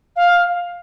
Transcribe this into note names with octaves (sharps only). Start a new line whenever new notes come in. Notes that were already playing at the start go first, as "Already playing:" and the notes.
F5